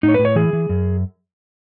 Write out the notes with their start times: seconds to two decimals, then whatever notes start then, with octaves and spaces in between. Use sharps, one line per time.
0.03 A2 D#4
0.09 C#5
0.14 A2 B4
0.25 C#5
0.36 E3 G#4
0.53 E3
0.69 F#2